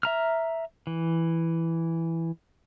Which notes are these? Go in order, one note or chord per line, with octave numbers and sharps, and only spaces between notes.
E5 A#5 F6
E3